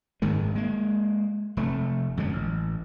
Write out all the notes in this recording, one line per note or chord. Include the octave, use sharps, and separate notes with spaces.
F#1 G#2 D#3 G#3
G#3 A#3
F1 A3
F#2 D3 G#3
A1